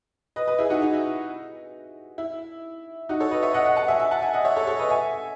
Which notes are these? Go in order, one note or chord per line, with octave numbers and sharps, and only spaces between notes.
B4 D#5
B4 D#5
E4 G#4
D#4 F#4
D#4
E4
E4
D#4 F#4
A4 C#5
B4 D#5
C#5 E5
D#5 F#5
D#5 F#5
F#5 A5
E5 G#5
E5 G#5
F#5 A5
E5 G#5
D#5 F#5
C#5 E5
A4 C#5
A4 C#5
B4 D#5
E5 G#5